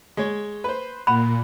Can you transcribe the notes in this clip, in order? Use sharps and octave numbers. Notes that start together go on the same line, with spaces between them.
G#3 C#5
B4 C5
A#2 F#5 B5